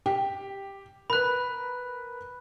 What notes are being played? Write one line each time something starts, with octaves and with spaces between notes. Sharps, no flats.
G4
A#4 B4 B5 F#6